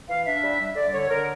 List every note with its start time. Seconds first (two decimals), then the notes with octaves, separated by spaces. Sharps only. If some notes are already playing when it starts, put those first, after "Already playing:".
0.09 E3 F5
0.26 D4 E5
0.43 G3
0.59 G3
0.76 D3 D5
0.93 D3 C#5
1.10 D3 A#4